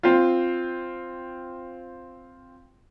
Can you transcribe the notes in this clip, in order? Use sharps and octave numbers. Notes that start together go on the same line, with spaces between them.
C4 F4